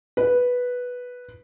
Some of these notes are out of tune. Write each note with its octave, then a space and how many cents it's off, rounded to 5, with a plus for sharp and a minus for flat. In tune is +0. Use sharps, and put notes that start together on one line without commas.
B4 -5